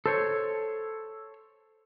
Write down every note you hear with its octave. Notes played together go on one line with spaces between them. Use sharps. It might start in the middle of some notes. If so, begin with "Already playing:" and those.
A4 C5 C#5